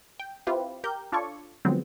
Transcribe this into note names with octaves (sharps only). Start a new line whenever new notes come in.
G5
C4 E4 F4 G4 B4
G4 A#4 G6
D4 F4 A4 C#5 D5 C#6
D3 F3 F#3 G#3 B3 C4